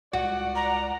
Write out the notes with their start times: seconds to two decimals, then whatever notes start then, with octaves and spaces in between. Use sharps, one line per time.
0.13 C#2 F#4 D5 F#5
0.56 A#5